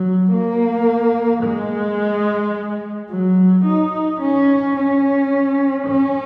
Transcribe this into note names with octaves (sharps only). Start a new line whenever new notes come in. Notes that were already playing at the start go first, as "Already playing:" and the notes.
Already playing: F#3
A#3
G#3
F#3
D#4
C#4
C#4
C#4